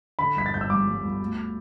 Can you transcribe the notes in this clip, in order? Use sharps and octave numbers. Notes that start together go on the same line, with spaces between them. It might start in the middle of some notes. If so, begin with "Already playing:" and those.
D3 B5
G1 B6
A6
G1 G6
E6
G2 D6
G2
G1
D2